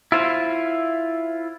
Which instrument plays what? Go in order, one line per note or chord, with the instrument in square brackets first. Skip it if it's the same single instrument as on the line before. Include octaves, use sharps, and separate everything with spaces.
[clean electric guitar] E4 F4 C5